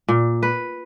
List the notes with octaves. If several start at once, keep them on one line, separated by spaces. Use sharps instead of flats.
A#2
B4